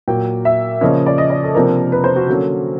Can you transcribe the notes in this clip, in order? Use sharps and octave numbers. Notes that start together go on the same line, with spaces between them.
A#2 F#3 A#3 G5
E5
C#3 F3 A#3 C#4 D#5
D5
D#5
D5
A4
C3 F3 A#3 D4 A#4
B4
C5
F#4
D3 F#3 A#3 C#4